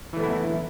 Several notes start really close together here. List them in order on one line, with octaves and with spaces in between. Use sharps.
E3 A3 B3 E4